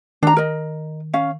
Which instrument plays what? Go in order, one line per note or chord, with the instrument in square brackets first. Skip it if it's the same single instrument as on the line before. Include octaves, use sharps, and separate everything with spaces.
[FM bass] D#3 [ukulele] D4 A#5
[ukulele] A#4 D#5
C#4 F5